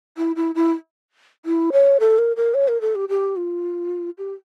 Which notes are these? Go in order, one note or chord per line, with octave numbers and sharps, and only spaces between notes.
E4
E4
E4
E4
C#5
A4
A#4
A#4
C#5
A#4
A4
G4
G4
F4
G4